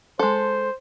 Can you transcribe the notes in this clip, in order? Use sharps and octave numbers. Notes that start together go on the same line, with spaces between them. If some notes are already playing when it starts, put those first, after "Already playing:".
G#3 A4 C5